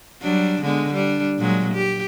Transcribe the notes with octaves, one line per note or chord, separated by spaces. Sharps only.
F#3 G3 D4
D3 G#3 B3
G3 D4
A#2 F#3 G#3
G4